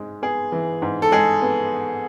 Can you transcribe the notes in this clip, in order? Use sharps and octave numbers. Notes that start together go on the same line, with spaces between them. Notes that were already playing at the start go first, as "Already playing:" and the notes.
Already playing: G#2 G#3
B3 G#4
E3
G#2
A4
G#3 G#4
B3